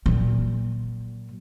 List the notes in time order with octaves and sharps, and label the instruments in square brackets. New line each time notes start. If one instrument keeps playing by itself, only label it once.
[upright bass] A#2 F#3